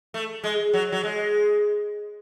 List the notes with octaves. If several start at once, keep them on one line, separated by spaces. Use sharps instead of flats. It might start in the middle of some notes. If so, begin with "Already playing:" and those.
A3
G#3
F#3
F#3
G#3